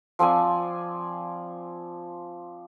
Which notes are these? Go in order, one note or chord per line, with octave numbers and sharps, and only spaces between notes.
F3 C4 D5 G#5